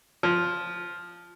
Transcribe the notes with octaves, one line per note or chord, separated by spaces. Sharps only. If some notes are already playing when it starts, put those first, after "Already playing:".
F3